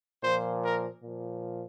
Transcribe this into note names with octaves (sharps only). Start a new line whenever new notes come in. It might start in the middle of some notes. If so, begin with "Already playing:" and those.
A#2 F3 C5
A#4
A#2 F3